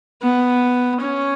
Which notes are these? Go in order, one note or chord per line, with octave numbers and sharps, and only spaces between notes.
B3
C#4